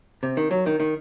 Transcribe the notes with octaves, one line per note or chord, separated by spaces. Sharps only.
C3
D#3
F#3
D#3
D#3